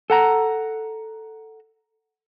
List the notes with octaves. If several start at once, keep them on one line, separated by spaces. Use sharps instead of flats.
A4 F#5 A#5